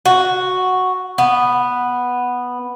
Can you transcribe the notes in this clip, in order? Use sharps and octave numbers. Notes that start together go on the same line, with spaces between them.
F#4
B3